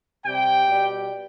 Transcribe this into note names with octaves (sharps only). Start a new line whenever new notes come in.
C3 G3 G5
B2 G3